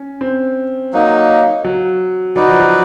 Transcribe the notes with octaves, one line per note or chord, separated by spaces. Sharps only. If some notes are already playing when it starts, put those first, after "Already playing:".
Already playing: C#4
C4
F#3 A#3 D#4
F#3
F#3 D#4 F#4 B4 D5
F3
F#3